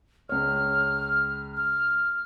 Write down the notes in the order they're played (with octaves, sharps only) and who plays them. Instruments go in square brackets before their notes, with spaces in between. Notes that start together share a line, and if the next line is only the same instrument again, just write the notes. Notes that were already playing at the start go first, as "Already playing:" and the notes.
[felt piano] C#2 C#5 [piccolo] F6
[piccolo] F6